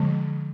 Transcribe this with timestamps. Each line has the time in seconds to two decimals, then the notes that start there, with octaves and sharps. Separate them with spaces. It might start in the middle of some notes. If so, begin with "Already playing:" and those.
Already playing: D3 F3 G#3